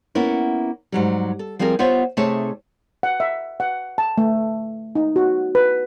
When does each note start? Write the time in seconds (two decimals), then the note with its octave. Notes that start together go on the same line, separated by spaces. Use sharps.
0.15 A#3 B3 C#4 E4
0.92 G#2 F#3 G3
1.39 A4
1.59 F3 G3 C4 G#4 A#4
1.79 B3 F4 C5 C#5 E5
2.17 C3 A3 D#4 G#4 C#5 A5
3.03 F#5
3.20 E5
3.60 F#5
3.98 A5
4.18 A3
4.95 D#4
5.16 F#4
5.55 B4